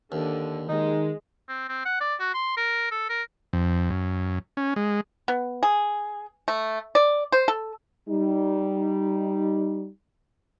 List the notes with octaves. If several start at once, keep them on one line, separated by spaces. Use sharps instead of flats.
D#2 D3
D#3 G#3 D#4
C4
C4
F#5
D5
F#4
C6
A#4
A4
A#4
F2
F#2
C#4
G#3
B3
G#4
A3
D5
C5
A4
G3 D#4